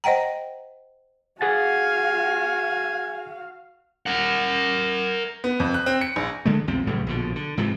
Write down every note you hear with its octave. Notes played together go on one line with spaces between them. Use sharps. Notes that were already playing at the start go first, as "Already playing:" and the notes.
C5 D#5 F#5 G5 A#5
F#4 G#4 F5 F#5 G#5 A6
A#4 F#5
B3
F2
F#6
C4
C#7
A#1
D3 G#3 A3
A#1 E2 C4
B1 A2 C#3 G3
A#1 B2 D3
D3
G#2 C3 E3 F3